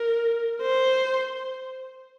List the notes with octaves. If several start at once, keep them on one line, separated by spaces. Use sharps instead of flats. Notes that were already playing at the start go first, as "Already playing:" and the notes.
Already playing: A#4
C5